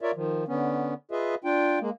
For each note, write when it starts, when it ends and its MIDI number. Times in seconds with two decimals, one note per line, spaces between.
0.01 0.11 65
0.01 0.11 70
0.01 0.11 73
0.01 0.11 74
0.01 0.11 76
0.15 0.44 51
0.15 0.44 53
0.48 0.94 50
0.48 0.94 59
0.48 0.94 61
1.11 1.35 65
1.11 1.35 68
1.11 1.35 71
1.11 1.35 75
1.11 1.35 76
1.44 1.79 62
1.44 1.79 65
1.44 1.79 79
1.81 1.90 56
1.81 1.90 58